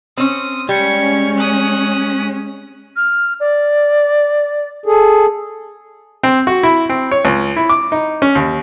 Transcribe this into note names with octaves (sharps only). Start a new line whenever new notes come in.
C4 C#4 D#6
G3 G#3 C#4 G#6 C#7
D#6 F#6
F6
D5
G#4 A4
C4
F#4
E4
C4
C#5
C#2
E4
D6
D#4
C#4
D#2